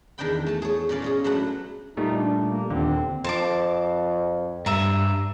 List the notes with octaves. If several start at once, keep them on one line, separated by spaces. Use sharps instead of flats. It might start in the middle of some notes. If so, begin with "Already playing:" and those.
E2 D#3 D4 D#5 G5 B5
A3 A5
G#4 C#5
A#2 C#4 C#5 D5 F5
G#3 C#4 G#4
A2 F#3 A3 D4 B4 F#5
A#2 G3 A3 D#4
D4
A#3
D#2 A#2 D3 C4
F2 C5 A5 D6
G2 E5 A#5